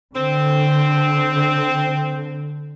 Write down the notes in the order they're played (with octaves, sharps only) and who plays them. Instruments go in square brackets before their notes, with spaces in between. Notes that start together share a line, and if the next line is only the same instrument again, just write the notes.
[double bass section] D3 [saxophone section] C4